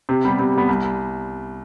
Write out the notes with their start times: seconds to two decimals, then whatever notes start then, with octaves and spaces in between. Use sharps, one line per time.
0.09 C3
0.25 G3 B3
0.39 C3
0.54 G3 B3
0.68 C2